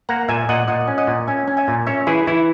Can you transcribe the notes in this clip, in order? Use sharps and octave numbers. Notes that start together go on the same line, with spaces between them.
A#3 F#5 A#5
A#2 E5 G#5
A#2 D#5 F#5
A#2 D#5 F#5
C#4
D#5 F#5
A#2
C#4 E5 G#5
C#4
E5 G#5
A#2
C#4 C#5 E5
E3 E4 G#4
E3 E4